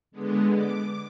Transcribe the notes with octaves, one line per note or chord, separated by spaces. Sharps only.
D3 G#3 B3
D6